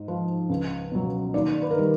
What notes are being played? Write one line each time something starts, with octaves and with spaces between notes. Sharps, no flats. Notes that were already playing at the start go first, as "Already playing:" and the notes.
Already playing: G#2
F3
C#2
B2 F#3
D#2 D5
B4
A#4
D#3 G3 B4